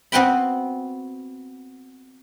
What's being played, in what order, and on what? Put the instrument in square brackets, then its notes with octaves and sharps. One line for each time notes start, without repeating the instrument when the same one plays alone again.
[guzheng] B3 C4 F#4 B4 G5 B5